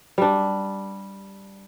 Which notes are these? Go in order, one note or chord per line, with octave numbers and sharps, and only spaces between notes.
G3 D4